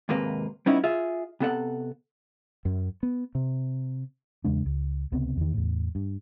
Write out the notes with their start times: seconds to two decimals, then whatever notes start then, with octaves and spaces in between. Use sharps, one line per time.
0.09 D#2 G#2 C3 A#3 B4
0.66 G3 B3 C#4 D#4 E4
0.84 F4 G#4 E5
1.40 C3 B3 A4 F#5
2.65 F#2
3.03 B3
3.35 C3
4.44 E2 C#3 G#3 D4
4.65 C#2
5.12 C#2 C3 B3 C4
5.37 E2 D#3
5.54 E2 A2
5.95 G2